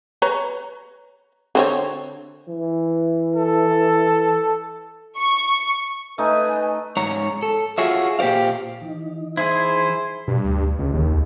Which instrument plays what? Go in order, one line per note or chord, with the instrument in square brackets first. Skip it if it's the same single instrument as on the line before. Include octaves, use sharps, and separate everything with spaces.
[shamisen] B4 C#5 A#5
D3 C4 C#5
[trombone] E3
[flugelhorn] A4
[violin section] C#6
[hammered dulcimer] A3 D#4 [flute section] B4 G#5
[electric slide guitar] G#2 C#5 A#5
A4
F4 F#4 G#4 C#5 E5
A#2 G4 C5 D5 F5
[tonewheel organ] E3 D#4
[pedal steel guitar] E4 G#4 [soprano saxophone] C5
[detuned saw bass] G2 [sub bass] B2
[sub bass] D2
[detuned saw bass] C#2
[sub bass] D1 [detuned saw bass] D#2
[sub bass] C#2